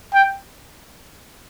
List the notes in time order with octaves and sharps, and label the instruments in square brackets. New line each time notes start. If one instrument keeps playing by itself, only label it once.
[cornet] G5